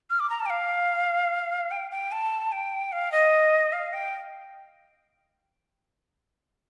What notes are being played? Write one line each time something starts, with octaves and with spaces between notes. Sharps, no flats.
F6
D6
A#5
A5
G5
F5
G5
G5
A5
G5
F5
D#5
F5
G5